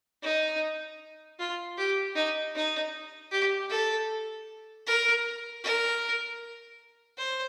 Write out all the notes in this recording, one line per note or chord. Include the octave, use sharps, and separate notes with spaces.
D#4
F4
G4
D#4
D#4
G4
A4
A#4
A#4
C5